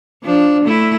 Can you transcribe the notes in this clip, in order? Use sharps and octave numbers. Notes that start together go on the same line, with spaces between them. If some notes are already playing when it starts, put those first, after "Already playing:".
F3 D4
A3 E4